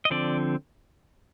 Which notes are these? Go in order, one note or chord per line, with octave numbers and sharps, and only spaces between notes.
D#5
D3 F3 C4 D5